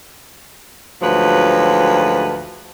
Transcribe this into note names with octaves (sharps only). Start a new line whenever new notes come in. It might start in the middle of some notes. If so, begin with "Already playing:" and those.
D2 G#2 F3 F#3 B4